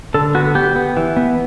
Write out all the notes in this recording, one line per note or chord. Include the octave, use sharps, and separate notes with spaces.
D3 A4
B3 F#4
B3 G4
B3
E3
B3